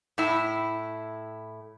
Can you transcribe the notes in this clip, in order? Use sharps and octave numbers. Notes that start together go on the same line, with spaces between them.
A2 E4